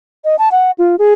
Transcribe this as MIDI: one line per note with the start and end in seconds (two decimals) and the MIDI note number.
0.25 0.36 75
0.39 0.49 81
0.52 0.71 78
0.78 0.96 65
0.99 1.13 68